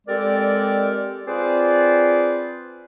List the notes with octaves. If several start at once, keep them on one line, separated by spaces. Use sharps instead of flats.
G#3 C4 G4 A4 A#4 D5
C4 F4 G#4 B4 C5 D5